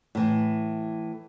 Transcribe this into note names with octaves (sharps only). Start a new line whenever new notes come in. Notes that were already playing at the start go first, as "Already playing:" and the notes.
A2 E3